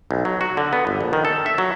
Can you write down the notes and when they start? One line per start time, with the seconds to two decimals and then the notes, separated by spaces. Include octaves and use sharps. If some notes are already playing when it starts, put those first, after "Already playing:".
0.11 B1
0.25 F#3
0.41 F#4
0.57 D3
0.73 B3
0.87 G1
1.01 A#1
1.13 D#3
1.25 A4
1.46 E5
1.58 F#3